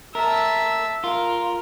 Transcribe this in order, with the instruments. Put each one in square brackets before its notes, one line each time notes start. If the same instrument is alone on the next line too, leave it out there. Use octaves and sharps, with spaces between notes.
[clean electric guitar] A#4 [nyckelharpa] E5 A5
[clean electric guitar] F4 [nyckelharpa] A#4